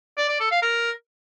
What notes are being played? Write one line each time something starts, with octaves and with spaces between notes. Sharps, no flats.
D5
D5
A4
F5
A#4